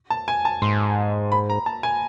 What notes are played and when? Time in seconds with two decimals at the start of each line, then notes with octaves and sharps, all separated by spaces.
0.10 A5
0.28 G#5
0.45 A5
0.62 G#2 C6
1.32 B5
1.50 A#5
1.66 A5
1.83 G#5